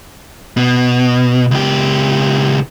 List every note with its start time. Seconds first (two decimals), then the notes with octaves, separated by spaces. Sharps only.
0.57 B2
1.51 C#2 G4